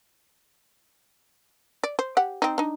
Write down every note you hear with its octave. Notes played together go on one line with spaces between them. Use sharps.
D5
C5
G4 F#5
C4 D#4
D4 D#4